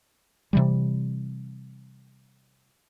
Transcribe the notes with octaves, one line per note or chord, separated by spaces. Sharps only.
C3 E3 G3